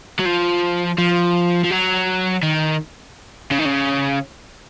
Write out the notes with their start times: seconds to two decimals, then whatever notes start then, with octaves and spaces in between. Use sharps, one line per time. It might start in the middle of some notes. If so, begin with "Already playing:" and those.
0.20 F#3
0.26 F3
0.98 F3
1.64 F3
1.71 F#3
2.43 D#3
3.51 C#3
3.59 D#3
3.65 C#3